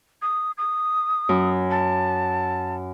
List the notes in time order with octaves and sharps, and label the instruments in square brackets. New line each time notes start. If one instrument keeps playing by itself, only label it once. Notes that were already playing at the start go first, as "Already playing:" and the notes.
[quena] D#6
D#6
[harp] F#2
[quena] A5